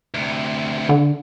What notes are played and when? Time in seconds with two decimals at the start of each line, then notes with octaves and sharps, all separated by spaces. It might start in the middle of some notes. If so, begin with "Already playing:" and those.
0.14 D2 C3
0.89 D3